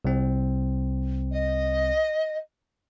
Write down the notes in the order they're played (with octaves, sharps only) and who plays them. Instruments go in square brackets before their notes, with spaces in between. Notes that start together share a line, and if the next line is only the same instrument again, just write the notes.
[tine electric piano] C2 C4
[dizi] D#5